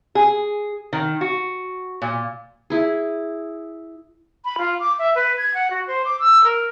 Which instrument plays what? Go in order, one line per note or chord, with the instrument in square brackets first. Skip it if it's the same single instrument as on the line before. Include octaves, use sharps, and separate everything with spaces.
[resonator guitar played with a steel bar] G#4
D#3
F#4
A#2
[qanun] E4 G#4
[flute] B5
F4
D6
E5
B4
G#6
F#5
F#4
C5
D6
E6
A#4